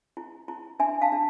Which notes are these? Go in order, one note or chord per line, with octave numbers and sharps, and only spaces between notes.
E4
E4
D4 E5 G#5
F5 A5
D4